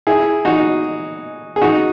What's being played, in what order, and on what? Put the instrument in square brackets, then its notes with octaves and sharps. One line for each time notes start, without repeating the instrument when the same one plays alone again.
[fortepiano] E4 G#4
D#4 F#4
G#4
D#4 F#4